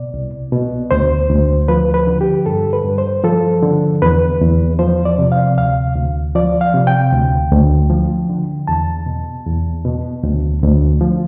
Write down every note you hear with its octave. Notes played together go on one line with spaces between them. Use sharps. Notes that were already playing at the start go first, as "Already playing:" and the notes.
Already playing: B2 D5
C2
B2
D2 C5
D2
F3 B4
B4
D3
G4
G2 A4
B4
G2
C5
F3 A4
D3
E2 B4
E2
F3 C5
D5
C3
F5
D2 F5
D2
F3 D5
F5
C3
G5
D2
D2
F3
D3
E2 A5
B2
E2
B2
D2
D2
F3